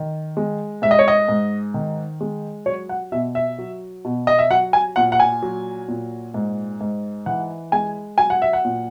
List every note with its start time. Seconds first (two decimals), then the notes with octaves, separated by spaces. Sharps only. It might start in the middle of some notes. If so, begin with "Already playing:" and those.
Already playing: D#3
0.37 G#3
0.82 G#2 E5
0.91 D#5
0.99 C#5
1.08 D#5
1.28 G#2
1.74 D#3
2.21 G#3
2.66 F#3 C#5
2.89 F#5
3.12 B2 E5
3.35 E5
3.58 F#3
4.05 B2
4.27 D#5
4.39 E5
4.50 F#3 F#5
4.73 G#5
4.96 A#2 F#5
5.12 F#5
5.20 G#5
5.42 F#3
5.88 A#2
6.34 G#2
6.81 G#2
7.26 E3 F#5
7.72 G#3 G#5
8.18 F#3 G#5
8.30 F#5
8.42 E5
8.53 F#5
8.65 A#2